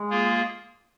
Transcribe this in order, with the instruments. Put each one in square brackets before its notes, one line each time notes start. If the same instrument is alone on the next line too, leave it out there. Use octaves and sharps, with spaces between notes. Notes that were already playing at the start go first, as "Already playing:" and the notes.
Already playing: [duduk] G#3
[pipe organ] A#3 F4 G#4